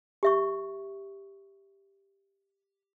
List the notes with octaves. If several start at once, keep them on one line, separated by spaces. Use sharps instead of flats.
G4 E5 C#6